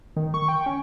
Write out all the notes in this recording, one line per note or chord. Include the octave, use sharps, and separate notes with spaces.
D#3
C#6
G5
C#4